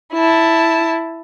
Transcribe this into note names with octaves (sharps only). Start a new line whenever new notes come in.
E4 A5